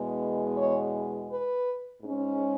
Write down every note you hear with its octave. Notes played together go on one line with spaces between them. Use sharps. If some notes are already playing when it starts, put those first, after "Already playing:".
Already playing: E2 B2 G#3 B3
C#5
B4
G#2 G#3 C#4